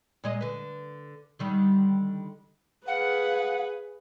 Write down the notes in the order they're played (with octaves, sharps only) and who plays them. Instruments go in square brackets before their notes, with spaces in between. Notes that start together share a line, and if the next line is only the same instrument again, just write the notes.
[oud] A#2 G#3 D#5
D3 B4
D3 D#3 G3
[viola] G#4 B4 [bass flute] F5 [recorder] F#5